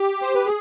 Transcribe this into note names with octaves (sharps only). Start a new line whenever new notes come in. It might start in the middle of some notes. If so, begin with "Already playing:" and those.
Already playing: G4
C5
B4
G#4